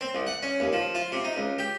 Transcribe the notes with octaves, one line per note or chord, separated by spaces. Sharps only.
C4
C2
F#5
C#4
D#2
F3
F4
C3
D#4
C#2
G4